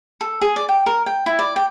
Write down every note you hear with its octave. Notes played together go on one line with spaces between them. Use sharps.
A4
G#4
D5
G5
A#4
G5
E4
D5
G5